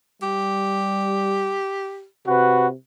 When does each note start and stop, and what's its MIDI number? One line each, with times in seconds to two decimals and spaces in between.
0.22 1.59 55
0.22 2.06 67
2.27 2.74 48
2.27 2.68 66
2.27 2.68 71